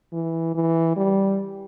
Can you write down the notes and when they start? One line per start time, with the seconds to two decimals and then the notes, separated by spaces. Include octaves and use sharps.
0.13 E3
0.55 E3
0.97 G3